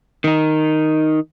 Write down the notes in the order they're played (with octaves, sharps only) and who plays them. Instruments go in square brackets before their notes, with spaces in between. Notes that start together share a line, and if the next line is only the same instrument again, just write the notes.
[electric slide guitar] D#3 D#4